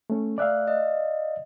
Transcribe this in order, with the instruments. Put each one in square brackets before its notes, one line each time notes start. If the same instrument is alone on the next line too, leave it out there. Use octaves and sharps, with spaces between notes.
[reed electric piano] A3 C#4
[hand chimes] A3 F#6 [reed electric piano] D5 E5 F5
[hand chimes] D#5